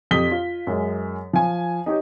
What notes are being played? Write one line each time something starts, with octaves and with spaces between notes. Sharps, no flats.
F2 G4 D#6 B6 G7
F4
F#2 G#3
F3 G#5
D#4 G4 C#5 D#5